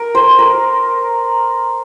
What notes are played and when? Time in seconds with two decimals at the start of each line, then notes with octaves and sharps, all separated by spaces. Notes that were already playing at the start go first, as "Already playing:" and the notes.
Already playing: A#4
0.15 C5
0.39 A#4